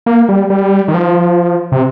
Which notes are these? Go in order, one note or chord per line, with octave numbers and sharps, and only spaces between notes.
A#3
G3
G3
D#3
F3
C3